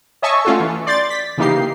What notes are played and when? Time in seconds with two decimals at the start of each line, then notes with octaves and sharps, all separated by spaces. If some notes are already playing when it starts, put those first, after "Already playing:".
0.22 C#5 D#5 E5 G#5 A5 C#6
0.45 A3 C#4 F4 F#4 A4
0.60 E3
0.87 D5 C6 G6 A6
1.10 B6
1.38 C#3 E3 A#3 D#4 G4 C7